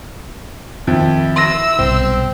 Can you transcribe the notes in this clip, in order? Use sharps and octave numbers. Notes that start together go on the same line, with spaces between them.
F2 D#3 E4
C6 E6 A#6
B1 G2 C3 C4